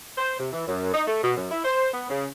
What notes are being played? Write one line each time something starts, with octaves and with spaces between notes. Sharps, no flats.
C5
C3
E3
F#2
D#4
A3
B2
F#2
E4
C5
B3
C#3